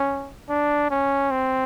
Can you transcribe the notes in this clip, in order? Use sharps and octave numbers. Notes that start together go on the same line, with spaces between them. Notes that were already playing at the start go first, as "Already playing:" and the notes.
Already playing: C#4
D4
C#4
C4